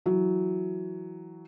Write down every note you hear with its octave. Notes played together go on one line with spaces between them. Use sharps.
E3 F#3